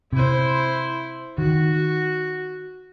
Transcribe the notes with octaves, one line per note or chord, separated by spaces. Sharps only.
C3 E4 C5
D#3 F#4